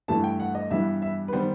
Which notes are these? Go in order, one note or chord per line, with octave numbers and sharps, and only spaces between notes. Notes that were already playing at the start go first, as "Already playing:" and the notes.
G2 E3 A3 A5
G5
F#5
D#5
G2 E3 G3 B3 E5
E5
B4
D#3 G3 B3 C5